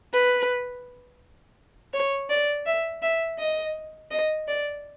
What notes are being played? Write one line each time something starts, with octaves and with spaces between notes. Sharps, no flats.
B4
C#5
D5
E5
E5
D#5
D#5
D5